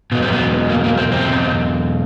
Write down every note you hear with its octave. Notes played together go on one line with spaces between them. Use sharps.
E2 B2 F#3 B3
C4
B3
A#3
A#3
C4
C4